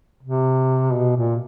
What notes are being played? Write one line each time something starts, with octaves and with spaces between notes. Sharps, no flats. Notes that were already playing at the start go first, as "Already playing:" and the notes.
C3
B2
A#2